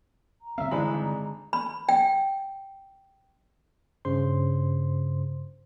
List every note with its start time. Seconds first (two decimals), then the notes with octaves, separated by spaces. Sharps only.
0.42 A#5
0.58 D3 G3 C4 E5 F5
0.71 G#1 E3 G#3 D4 B5
1.53 B5
1.89 G5
4.05 G2 C#3 C5 C6